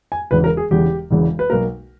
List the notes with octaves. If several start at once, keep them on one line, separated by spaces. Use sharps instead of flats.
G#5
E1 E2 C#3 E3 B4
A#4
G#4
E1 E2 C#3 E3 G4
E1 E2 C#3 E3
B4
B1 B2 A#3 A#4